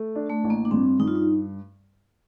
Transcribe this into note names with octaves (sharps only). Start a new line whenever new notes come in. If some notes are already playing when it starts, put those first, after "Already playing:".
Already playing: A3
D4
A3
A1
A#3
D4
G2 C4
G2 D#4
F4
D#4